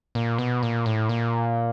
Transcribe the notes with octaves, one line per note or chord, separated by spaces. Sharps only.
A#2
B2
A#2
A2
A#2